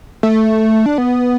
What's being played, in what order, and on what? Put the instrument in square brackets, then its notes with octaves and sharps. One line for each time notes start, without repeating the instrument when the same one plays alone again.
[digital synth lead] A3
D4
B3